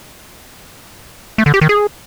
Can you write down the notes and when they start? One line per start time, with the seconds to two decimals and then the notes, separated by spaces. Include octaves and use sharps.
1.38 A3
1.46 D3
1.54 G4
1.61 D#3
1.69 G#4